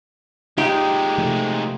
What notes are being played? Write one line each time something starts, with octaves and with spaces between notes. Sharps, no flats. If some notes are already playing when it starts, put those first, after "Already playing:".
A#2 G#3 D#4 G4
C3 F3 A3